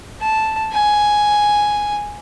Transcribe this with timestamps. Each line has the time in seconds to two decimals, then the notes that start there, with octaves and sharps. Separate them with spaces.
0.20 A5
0.73 G#5